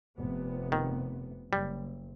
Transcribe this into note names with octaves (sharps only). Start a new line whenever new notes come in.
F1 C3 B3
D#3
F#1 G3